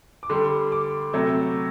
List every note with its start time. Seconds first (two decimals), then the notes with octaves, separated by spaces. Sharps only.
0.23 D6
0.29 D3 G3 C6
0.72 D6
1.13 C3 F#3 A3 E6